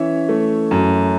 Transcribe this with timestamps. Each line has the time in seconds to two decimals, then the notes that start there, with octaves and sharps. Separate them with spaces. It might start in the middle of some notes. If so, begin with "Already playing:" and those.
Already playing: E3 C#4 C#5 E5
0.29 A3
0.71 F#2